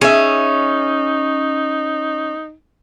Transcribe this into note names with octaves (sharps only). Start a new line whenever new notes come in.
C#4 D#4 G#4 E5